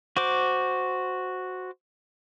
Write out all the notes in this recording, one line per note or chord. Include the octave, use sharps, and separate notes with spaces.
F#4 C5 D6